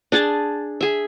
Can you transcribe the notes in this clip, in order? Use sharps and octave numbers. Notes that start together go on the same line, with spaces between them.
D4 G#4 A5
G#4 E5